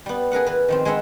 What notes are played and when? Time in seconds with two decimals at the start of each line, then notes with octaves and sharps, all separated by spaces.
0.06 G3 B3
0.31 G#4 A#4 B4 F#5
0.46 E3 B4
0.68 D#3 F3 C4
0.85 G#3 G#4 B4 E5 F#5 B5